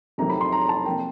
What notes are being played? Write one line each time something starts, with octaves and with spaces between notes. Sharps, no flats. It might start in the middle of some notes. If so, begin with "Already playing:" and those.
F2 C3 D#3 F#3 A3 A#5
B5
C6
A#5
A5
C3 F3 A#3 G5